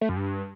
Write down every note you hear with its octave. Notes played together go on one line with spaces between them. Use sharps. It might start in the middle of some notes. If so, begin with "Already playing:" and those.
A3
F#2
G2